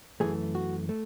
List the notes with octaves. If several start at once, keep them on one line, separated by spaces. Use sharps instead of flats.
F#2 E3 A3 G#4
F#4
A3